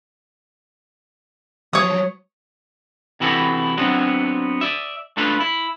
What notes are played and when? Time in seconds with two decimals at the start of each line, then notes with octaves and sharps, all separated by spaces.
1.73 F3 F#3 C#5 D#6
3.20 C3 E3 E4 F#4 G#4 A4
3.78 F#3 B3 C4 D4 F#4
4.61 D5 E5
5.17 A3 D4 F4 A4 B4
5.40 E4